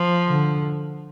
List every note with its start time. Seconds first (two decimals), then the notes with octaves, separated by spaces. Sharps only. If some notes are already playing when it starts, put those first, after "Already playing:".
Already playing: F3
0.29 D3